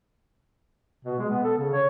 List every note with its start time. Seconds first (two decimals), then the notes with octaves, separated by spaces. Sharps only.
1.05 B2
1.19 G#3
1.30 B3
1.44 A4
1.57 C#3
1.73 C#5